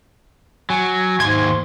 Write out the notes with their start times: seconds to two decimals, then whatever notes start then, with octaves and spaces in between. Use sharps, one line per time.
0.70 F#3 G#5
1.20 D#2 G#2 C6 G#6